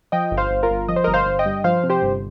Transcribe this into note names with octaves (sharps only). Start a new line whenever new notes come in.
F3 D#5 G5
G1
C5 F5
G1
F4 A#4
G1
F3 D#5
C5
G1 A#4 D#5
C5 F5
G1
D#5 G5
G2
F3 C5 F5
C3
G4 C5
G1